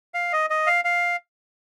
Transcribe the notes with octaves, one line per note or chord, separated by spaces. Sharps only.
F5
D#5
D#5
F5
F5